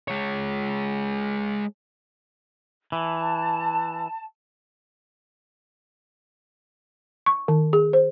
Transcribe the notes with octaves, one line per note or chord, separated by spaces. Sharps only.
G#3 C#5
E3 A5
C#6
D#3
G#4
C5